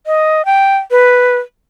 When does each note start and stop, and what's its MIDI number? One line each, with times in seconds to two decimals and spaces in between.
0.06 0.45 75
0.45 0.77 79
0.91 1.37 71